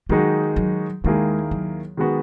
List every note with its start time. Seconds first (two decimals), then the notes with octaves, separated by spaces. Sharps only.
0.09 D#3 F#3 G#3 D#4 F#4
0.56 F#3
1.04 D#2 D#3 G#3 A#3 E4 G#4
1.51 F#3
1.97 D#3 G#3 B3 F#4